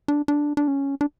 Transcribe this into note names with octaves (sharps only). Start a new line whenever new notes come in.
D4
D4
D4
C#4
D4